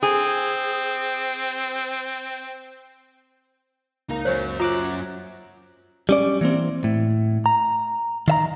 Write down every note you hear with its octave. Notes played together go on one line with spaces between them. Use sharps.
C4 G#4
C#2 A#3 D#4 A#5
F#2 F#3 C5 C#5
F4 A#5 D6 F#6
G3 C#4 D5
E3 A#3 C4
A2
A#5
D#3 E5 A#5